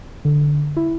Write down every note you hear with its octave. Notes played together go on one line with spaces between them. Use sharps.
D3
E4